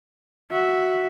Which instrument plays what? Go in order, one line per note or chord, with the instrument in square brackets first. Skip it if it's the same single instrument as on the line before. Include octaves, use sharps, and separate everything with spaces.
[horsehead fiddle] F#4 E5